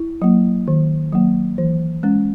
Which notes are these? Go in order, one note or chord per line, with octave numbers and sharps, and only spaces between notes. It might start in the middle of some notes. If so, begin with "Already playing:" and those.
Already playing: E4
F#3 A#3
D#3
F#3 A#3
E3
G#3 C#4